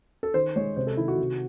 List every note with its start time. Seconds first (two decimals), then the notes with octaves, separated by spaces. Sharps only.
0.23 A4
0.34 D#3 C5
0.56 G#3 C#5
0.77 C3 C5
0.87 A4
0.97 D#3 E4
1.08 F#4
1.18 C3